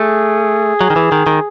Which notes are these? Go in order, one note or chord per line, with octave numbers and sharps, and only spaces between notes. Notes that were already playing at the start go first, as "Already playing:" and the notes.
Already playing: A3 G#4
F#3
D#3
E3
D#3
D#3